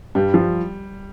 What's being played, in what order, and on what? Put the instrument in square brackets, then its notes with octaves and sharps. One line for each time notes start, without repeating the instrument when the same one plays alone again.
[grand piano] G2 [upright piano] G3
[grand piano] F3